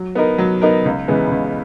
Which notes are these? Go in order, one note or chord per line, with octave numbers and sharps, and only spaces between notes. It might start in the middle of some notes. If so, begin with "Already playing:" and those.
Already playing: F#3
B3 D#4 A#4
F#3
B3 D#4 A#4
C#2
C#3 E3 G#3 B3
C#2